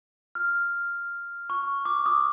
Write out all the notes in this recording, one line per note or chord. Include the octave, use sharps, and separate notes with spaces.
F6
C#6
D6
D#6